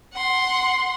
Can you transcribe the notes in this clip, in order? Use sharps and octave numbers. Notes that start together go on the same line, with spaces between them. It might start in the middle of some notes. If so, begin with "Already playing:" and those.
F#5 C6